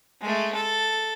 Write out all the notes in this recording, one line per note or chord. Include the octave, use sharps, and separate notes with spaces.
G#3 A3
A4